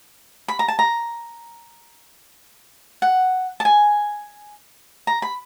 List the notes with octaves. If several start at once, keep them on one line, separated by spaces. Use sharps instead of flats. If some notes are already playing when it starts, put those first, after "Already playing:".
B5
A#5
A5
A#5
F#5
A5
G#5
A#5
B5